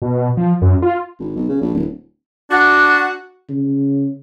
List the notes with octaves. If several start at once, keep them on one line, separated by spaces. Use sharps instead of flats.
B2
F3
F#2
F4
G#1
B1
C#3
A#1
D1
D4 F#4
C#3